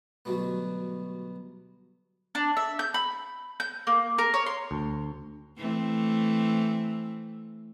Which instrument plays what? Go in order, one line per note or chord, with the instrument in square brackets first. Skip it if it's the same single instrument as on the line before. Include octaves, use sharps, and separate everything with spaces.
[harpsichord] D2 B2 F#3 G3 B3
[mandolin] D4
E5
G6
B5
G6
A#3
A#4
C#5
C6
[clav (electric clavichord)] D2
[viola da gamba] E3 A3 C4